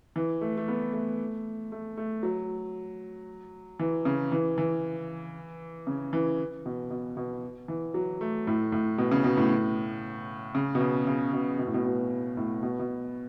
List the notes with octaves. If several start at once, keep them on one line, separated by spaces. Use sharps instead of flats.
E3
A3
A3
B3
A3
A3
A3
F#3
E3
C#3
E3
E3
C#3
E3
B2
B2
B2
E3
F#3
A3
A2
A2
B2
C#3
B2
A2
C#3
B2
C#3
C#3
B2
B2
A2
B2
B2
A2
B2
B2